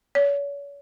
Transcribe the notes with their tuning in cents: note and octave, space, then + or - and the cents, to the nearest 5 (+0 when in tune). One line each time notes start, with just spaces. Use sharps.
C#5 +40